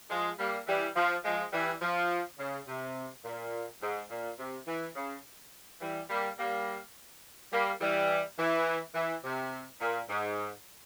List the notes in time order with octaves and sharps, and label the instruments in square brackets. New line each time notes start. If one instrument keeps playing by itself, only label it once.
[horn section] F3 G#3
G3 A#3
E3 G3
F3
F3 G#3
E3 G3
F3
C#3
C3
A#2
G#2
A#2
C3
E3
C#3
E3 G3
G3 A#3
G3 A#3
G3 A#3
E3 G3
E3
E3
C3
A#2
G#2